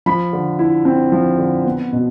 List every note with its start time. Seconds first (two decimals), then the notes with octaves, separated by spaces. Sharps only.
0.06 F3 B5
0.33 D3
0.59 E4
0.85 C4
1.12 F3
1.38 D3
1.65 B3
1.92 B2